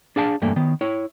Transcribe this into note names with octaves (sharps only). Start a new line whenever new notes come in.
D4 G#4 F5 A5
E2 G2 A3 A#3
D#3 B3
E4 C#5